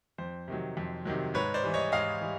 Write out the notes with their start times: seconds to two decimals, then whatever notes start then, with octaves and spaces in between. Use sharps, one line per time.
0.18 F2 C5
0.48 C3 D#3 F#3
0.77 F2
1.05 C3 D#3 F#3
1.34 G#2 B4 C#5
1.54 C5 D5
1.63 E3 G3
1.74 C#5 D#5
1.92 G#2 D#5 F5
2.21 E3 G3